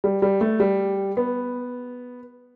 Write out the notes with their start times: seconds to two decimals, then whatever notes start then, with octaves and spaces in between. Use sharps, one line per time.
0.04 G3
0.22 G3
0.41 A3
0.60 G3
1.17 B3